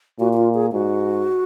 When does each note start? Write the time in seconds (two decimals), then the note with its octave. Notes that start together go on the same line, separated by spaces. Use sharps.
0.19 A#2 F#4
0.33 F#4
0.37 F4
0.54 G#4
0.72 G#2 F#4